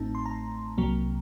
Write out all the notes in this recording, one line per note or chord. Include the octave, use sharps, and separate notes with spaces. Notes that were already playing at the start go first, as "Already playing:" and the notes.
Already playing: A1 A2 A3 C4 D#4 A5
C6
A#5
C2 C3 F#3 A#3